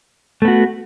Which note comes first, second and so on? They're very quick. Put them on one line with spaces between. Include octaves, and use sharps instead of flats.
A3 B3 F#4